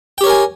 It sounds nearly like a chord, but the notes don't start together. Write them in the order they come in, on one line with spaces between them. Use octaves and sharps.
G5 G4 C#5 A#4 G#5